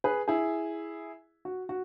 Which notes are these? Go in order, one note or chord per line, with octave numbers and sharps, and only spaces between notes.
G#4 B4
E4 G#4
F#4
F#4